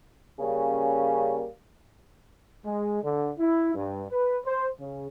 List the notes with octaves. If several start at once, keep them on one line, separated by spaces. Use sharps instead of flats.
C#3 G3 A#3 C#4
G#3
D3
E4
G2
B4
C5
C#3